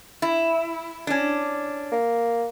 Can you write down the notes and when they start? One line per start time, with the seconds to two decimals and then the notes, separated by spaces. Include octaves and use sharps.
0.22 E4
1.07 C#4 D4
1.92 A#3